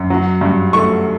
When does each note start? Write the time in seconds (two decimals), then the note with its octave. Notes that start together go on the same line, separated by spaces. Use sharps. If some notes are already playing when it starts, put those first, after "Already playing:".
Already playing: F#2
0.10 F#3
0.41 G2
0.73 A3 C#6